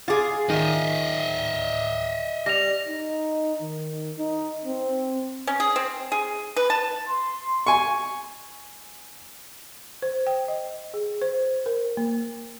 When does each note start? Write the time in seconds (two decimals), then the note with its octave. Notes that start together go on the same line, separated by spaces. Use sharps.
0.08 F4 G#4 D6 A6
0.50 D#3 D#5 E5
2.46 G3 A#6 F7
2.88 D#4
3.62 D#3
4.18 D#4
4.65 C4
5.47 C#4
5.60 G#4
5.76 C4
6.12 G#4
6.56 B4
6.70 A5
7.08 C6
7.67 G#5 C#6
10.02 C5
10.27 G5
10.48 D#5
10.94 G#4
11.22 C5
11.66 A#4
11.97 A#3